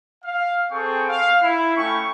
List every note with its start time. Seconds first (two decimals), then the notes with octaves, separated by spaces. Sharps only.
0.25 F5
0.71 C4 G#4 A4 G5 C#6
1.09 F5
1.43 E4
1.77 A3 C#4 G5 C#6